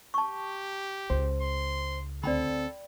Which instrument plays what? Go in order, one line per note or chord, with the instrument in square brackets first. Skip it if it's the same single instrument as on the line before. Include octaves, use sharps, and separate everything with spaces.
[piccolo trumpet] G4 [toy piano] A5 C#6
[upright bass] C#2 [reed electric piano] C5
[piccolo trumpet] C6
[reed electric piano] D2 C4 [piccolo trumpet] A4 [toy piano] D5 G5 B5